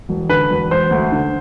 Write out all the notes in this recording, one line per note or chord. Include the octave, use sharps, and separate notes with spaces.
E1
D3 B4
E1
E1 C5
D2
D3